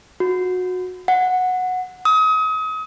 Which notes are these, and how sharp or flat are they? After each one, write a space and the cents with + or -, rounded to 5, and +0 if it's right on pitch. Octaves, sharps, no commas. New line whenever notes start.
F#4 -20
F#5 -10
D#6 +35